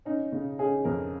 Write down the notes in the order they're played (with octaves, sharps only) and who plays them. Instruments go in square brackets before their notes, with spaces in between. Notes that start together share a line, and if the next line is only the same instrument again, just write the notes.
[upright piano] C#4 D#4
C#3
C#4 G#4
F2 A#4